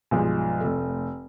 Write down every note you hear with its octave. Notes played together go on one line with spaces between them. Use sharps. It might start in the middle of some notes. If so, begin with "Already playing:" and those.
B1 G2 F3 G#3
F1 A3